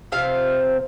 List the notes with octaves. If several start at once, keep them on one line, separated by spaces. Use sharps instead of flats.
C3 F3 C4 F5